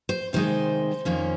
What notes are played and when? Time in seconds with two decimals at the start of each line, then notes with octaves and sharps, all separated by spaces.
0.09 C5
0.33 C3 D#3 G#3 D#4 C5
1.05 F2 D#3 A#3 C#4